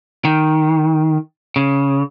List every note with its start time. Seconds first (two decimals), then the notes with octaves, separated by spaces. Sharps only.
0.25 D#3
1.56 C#3